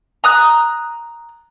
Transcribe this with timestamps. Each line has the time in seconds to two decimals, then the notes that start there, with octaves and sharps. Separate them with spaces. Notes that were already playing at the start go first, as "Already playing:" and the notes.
0.24 A#5 D#6 F#6